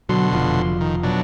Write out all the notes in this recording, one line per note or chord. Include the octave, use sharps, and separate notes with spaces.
B2 D3 F#3 C6
F1 F3
D#3
B2 F#3 D4